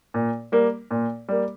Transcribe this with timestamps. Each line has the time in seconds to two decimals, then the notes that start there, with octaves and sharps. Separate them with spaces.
0.14 A#2
0.52 G3 A#3
0.91 A#2
1.29 G3 A#3